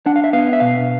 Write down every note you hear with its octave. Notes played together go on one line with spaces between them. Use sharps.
D4 F#5
F5
E5
B3 F5
E5
B2 F5